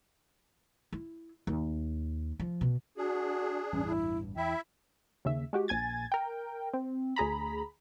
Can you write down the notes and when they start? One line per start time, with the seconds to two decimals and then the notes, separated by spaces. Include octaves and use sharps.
0.93 E4
1.47 D#2
2.39 F3
2.61 B2
2.97 D4 F#4 G#4
3.73 A1 E2 G2 C#4
3.86 E4
4.37 E2 E4 E5 G5
5.25 D#2 C#3 E5
5.53 G#3 F#4 G4
5.68 A#1 G#5 G#6 A6
6.12 A#4 G5
6.74 C4
7.16 D2 G#4 A#5 B5